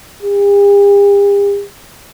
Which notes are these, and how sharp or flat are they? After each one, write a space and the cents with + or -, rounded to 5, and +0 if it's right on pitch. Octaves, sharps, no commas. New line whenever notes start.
G4 +45